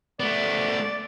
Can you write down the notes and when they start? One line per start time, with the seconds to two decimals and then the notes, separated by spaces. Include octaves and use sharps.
0.20 A3 B3 D5